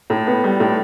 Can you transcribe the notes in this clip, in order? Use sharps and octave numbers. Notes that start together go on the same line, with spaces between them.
A2
B3
G3
A2